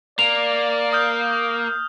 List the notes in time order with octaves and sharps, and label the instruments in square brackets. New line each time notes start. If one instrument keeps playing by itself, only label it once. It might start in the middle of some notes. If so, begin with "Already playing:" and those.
[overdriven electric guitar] A#3 [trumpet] D5 [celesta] F7
[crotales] D#6 F6 G6